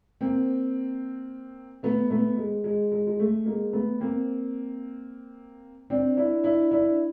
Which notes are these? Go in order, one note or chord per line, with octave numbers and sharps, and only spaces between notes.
A#3 C4
A3 B3
A3 B3
G#3
G#3
G#3
G#3
A3
G#3 A#3
A3 B3
A#3 C4
C4 D4
D4 E4
D4 E4
D4 E4